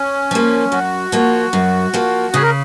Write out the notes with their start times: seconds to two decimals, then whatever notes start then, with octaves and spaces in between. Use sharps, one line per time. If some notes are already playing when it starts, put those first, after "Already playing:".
Already playing: C#4
0.31 F3 A#3
0.72 F#2 F#4
1.12 F3 A#3
1.53 F#2
1.94 F3 A#3
2.34 C#3 G#4
2.42 A#4